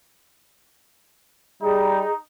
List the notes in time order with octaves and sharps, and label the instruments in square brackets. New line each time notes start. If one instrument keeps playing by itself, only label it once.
[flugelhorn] G3 [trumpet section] D#4 [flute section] G#4